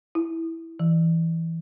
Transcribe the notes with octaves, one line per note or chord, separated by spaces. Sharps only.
E4
E3